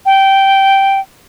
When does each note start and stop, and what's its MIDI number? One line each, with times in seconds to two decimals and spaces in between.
0.06 1.00 79